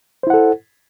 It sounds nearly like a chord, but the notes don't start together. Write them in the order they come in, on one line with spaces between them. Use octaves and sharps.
C5 E4 F#5 A4